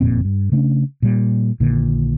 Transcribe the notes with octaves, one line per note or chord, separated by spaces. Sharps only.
F#1 F2 A#2 C4
G2
C#3 A3 C#4 D4
A#2 G3
A#1 A#2 D3 D#3